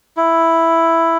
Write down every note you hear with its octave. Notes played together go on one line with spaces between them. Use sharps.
E4